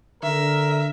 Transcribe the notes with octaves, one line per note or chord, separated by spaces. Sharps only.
D3 A#4 E5